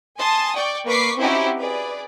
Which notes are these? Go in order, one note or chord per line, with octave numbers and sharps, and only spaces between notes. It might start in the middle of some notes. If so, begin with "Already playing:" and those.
G#5 A5 C6 D#6
D5 G5 C#6
A#3 B4 C#6 D6 B6 C7
C4 C#4 D#4 E4 F#4 G4
G#4 B4 D5